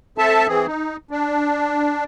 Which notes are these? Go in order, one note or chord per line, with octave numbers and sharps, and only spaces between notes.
C4 A4 E5 A5
E3 C4 G#4
D#4
D4